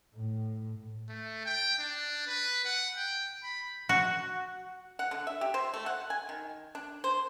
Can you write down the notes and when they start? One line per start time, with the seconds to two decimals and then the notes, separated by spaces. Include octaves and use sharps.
0.15 A2
1.09 A3
1.46 G5
1.79 D4
2.28 B4
2.65 F#5
2.97 G5
3.43 B5
3.89 F#4
4.99 F#5
5.11 D3
5.27 E5
5.41 G4
5.54 C5
5.74 A3
5.86 F#5
6.10 G#5
6.29 D#3
6.75 D4
7.04 C5